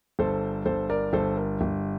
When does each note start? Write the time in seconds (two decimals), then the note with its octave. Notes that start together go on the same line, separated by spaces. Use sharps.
0.19 G1 A4 C5
0.66 G1 A4 C5
0.90 A#4 D5
1.13 G1 A4 C5
1.37 A#4
1.61 G1